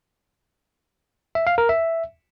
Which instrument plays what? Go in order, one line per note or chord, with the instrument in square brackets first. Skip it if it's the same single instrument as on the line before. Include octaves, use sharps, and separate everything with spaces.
[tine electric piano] E5
F5
A#4
E5